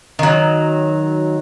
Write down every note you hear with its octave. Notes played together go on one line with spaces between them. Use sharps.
D#3 F#3